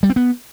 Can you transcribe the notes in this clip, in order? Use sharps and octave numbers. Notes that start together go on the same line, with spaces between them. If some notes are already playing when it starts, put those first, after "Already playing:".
G3
C4
B3